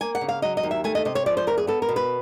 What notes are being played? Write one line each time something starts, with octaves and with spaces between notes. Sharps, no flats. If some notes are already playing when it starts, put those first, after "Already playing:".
A#3 G#5
F#5
C#3
F5
F#3 D#5
D#5
D#2
E5
A3 G#5
D#5
C3 D#5
C#5
F3 D5
C5
E2 A#4
G#4
B3 A4
A#4
B2
B4